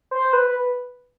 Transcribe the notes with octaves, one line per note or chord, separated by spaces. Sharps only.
C5
B4